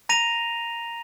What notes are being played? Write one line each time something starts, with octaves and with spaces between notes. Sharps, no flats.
A#5 A#6 D#7 F7